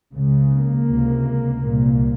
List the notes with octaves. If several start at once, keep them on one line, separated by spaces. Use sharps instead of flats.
C#2 C#3
A#3
C#2 C3
C2 A#2